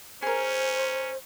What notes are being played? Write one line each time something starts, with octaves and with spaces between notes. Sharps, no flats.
C#4 G#4 A#4 C5